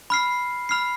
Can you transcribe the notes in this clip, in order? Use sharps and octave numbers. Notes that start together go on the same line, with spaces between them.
B5 F6 C7
B5 F6 C7